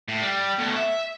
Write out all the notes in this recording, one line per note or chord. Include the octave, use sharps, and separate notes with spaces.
A2
G3
B2 A3
E5